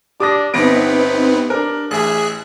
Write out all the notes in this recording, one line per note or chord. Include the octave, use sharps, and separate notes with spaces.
D4 G4 D6 D#6 A#6
G1 B3 C4 D#4 B4 A#6 D7
D4 A#4
A1 G#4 E5 F#6